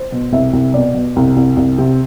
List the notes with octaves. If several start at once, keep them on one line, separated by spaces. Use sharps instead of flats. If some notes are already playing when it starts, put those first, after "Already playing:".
Already playing: C5
B2
C2 E5
C2
B2 D5
B2
C2
C2
C2
C3